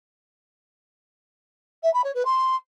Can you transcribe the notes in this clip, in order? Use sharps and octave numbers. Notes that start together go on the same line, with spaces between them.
E5
B5
C#5
B4
C6